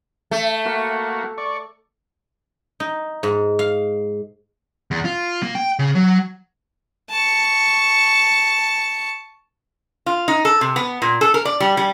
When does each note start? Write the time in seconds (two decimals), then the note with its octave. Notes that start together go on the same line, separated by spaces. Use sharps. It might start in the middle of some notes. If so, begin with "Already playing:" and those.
0.31 A3
0.66 A#3 F#4
1.38 D5 C#6
2.80 D#4
3.23 G#2
3.59 F5
4.91 E2
5.05 F4
5.42 A#3
5.55 G5
5.79 C#3
5.95 F#3
7.10 A5 C#6
10.06 F4
10.28 D#4
10.45 A4
10.61 C3
10.76 B3
11.02 A#2
11.21 A4
11.34 A#4
11.45 D5
11.60 G3
11.77 G3